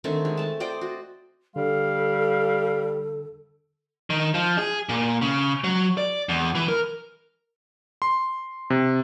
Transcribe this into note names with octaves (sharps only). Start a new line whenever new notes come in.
D3 D#3 A3 C4
G#3
A3 A5
C5 D5 D#5 G5
F#4
D3 G3 A4 F5
D#3
F3
G#4
A#2
C#3
F#3
D5
E2
E3
A#4
C6
C3